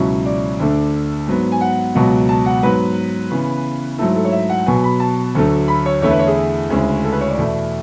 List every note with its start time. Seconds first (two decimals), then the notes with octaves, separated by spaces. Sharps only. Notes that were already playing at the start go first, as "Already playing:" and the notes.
Already playing: C#2 B2 F#3 C#4 E4
0.26 D5
0.59 D2 D3 A3 D4
1.28 G#2 F#3 B3
1.52 G#5
1.61 F#5
1.95 C#2 B2 F#3 B3
2.29 A5
2.46 F#5
2.63 G#2 F#3 B3 B4
3.31 C#3 E3 B3
3.98 G#2 F#3 A3 E4 A4
4.16 A4
4.25 C#5
4.32 E5
4.50 F#5
4.66 B2 F#3 B3 G#5
4.84 B5
5.00 A5
5.35 D2 D3 F#3 A3
5.68 B5
5.86 C#5
6.02 E2 D3 A3 E4 C#5
6.11 B4
6.19 C#5
6.27 G#4
6.70 D2 C#3 G#3 C#4 E4
7.04 A4
7.12 B4
7.21 C#5
7.30 D5
7.37 E2 B2 A3 E4